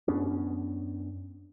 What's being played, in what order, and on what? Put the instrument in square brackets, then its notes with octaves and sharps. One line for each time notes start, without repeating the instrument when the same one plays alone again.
[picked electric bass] F#2 B3 C#4 D4